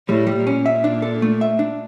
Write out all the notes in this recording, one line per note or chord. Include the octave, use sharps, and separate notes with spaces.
A2 G3
G3
A#2
C#4
E5
D4
A4
A3
E5
D4